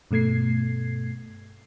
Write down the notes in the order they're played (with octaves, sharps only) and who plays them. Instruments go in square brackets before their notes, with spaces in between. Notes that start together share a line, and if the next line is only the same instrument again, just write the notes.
[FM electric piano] G2 B2 A3 G#6 C7